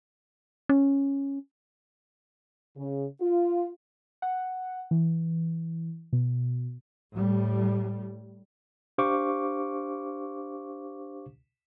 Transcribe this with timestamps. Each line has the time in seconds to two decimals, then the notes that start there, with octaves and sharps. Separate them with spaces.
0.69 C#4
2.76 C#3
3.20 F4
4.22 F#5
4.91 E3
6.13 B2
7.14 A2 G3
8.98 D4 G4 C5 F5 C#6 D6